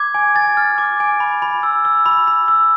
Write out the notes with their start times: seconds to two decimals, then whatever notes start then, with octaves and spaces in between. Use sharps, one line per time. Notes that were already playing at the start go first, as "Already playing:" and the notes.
Already playing: D6 G#6
0.14 G#5
0.35 G#5 A6
0.57 F6
0.78 D6
1.00 G#5
1.20 B5
1.42 B5
1.63 E6
1.85 E6
2.06 B5
2.27 B5
2.48 E6